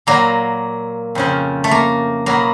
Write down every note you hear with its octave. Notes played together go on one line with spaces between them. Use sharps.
A#2 F#3 A#3
F2 C#3 F3
A3
A#3
B2 F#3 A#3